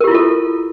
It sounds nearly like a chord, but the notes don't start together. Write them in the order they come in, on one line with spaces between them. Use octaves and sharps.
A#4 G4 E4 F4 A4